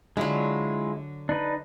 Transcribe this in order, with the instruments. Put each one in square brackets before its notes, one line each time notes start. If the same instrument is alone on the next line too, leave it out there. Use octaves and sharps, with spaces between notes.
[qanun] D3 F#3 [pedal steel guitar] G#3 E4 F4
[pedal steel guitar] D4 D#4 B4